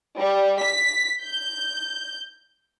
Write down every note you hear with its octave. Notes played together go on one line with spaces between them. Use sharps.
G3
B6
G6